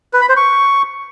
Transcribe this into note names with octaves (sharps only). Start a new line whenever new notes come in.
B4
B5
C5
C#6